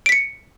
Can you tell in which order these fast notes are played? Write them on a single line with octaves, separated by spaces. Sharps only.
D7 B6 C#7